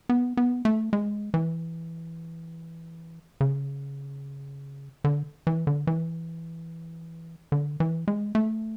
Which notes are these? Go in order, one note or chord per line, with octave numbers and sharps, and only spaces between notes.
B3
B3
A3
G#3
E3
C#3
D3
E3
D3
E3
D3
E3
G#3
A3